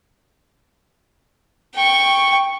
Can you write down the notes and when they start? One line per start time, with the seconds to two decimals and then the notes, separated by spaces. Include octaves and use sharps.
1.75 G5 C#6